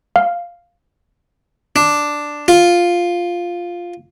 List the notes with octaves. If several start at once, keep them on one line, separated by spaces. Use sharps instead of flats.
F5
D4
F4